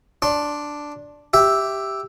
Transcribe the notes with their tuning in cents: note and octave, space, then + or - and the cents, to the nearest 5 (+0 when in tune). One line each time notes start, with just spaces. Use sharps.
D4 +0 C6 +35
G4 +0 E5 +0